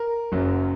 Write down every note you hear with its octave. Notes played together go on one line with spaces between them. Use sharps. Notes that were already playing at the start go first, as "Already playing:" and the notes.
Already playing: A#4
F#1 F#2 F#3